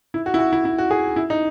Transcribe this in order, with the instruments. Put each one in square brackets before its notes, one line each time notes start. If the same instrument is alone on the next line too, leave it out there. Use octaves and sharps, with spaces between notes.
[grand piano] E4
F#4
E4
F#4
E4
E4
F#4
G#4
E4
D#4